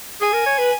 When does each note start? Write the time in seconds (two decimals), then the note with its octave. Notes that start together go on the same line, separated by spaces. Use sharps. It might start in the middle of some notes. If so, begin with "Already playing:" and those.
0.21 G#4 G#5
0.33 A#4
0.46 C#5
0.59 B4